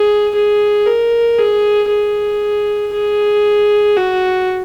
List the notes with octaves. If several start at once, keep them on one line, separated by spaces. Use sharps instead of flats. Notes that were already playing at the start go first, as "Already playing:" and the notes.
Already playing: G#4
G#4
A#4
G#4
G#4
G#4
F#4